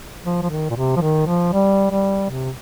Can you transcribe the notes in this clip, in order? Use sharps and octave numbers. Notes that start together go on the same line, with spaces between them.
F3
F3
D#3
A#2
C3
F3
D#3
F3
G3
G3
C3